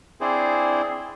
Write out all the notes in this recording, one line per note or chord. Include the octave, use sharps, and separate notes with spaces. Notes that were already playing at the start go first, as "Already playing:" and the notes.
C4 D4 E4 G#4 C5